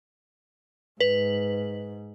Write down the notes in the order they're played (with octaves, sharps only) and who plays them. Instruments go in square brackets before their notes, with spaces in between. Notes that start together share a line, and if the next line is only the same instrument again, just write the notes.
[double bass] G#2 [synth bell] B4